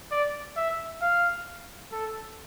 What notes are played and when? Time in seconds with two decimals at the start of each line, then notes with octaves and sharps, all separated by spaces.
0.11 D5
0.57 E5
1.01 F5
1.92 A4